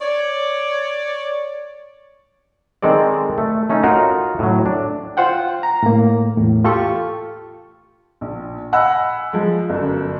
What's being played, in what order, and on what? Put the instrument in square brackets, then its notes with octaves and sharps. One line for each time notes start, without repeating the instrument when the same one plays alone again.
[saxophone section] C#5 D5
[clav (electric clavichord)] D#3 G#3 C4 A4 D5
A3
A3 C#4 D#4
D#4 F4 F#4 A#4
A2 F#3
D4
[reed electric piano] F4 C5 F#5 G5
A#5
A2 A#3
E2 A2
F4 G4 A4 C#6
[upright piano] A#1
D#5 F#5 G#5 B5 E6 F#6
F3 G#3
G1 F#2